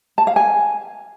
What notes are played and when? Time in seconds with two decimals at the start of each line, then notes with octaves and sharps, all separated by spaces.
0.18 A5
0.27 F5
0.36 G#5